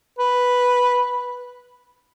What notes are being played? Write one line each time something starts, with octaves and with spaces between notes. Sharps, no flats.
B4